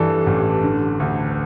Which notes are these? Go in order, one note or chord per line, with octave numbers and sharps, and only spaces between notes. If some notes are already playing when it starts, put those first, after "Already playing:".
Already playing: G2 E3 G3 D4 A4
A1
D3
D2